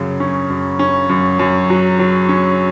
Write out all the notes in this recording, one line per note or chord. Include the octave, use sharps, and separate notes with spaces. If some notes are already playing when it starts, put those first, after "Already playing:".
Already playing: F#2 C#3
C#4
F#2
C#4
F#2
F#2
F#3
F#3
C#4